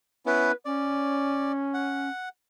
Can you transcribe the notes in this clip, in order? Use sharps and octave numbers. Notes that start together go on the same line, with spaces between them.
B3 C#4 E4 B4
C#4 D5
F#5